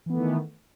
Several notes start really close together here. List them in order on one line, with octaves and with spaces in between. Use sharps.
E3 B3 A3 D#3